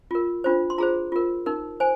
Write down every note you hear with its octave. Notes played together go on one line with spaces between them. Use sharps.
F4 A#4
D4 F4 C5
C6
F4 G#4 C5 A#5
F4 A#4
D#4 A#4
C5 G#5